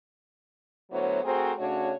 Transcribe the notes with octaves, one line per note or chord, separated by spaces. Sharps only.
D2 F#3 B3 E4 C5 C#5
A3 C4 F#4 G#4 A#4 C5
C#3 A3 D4 F#4 C#5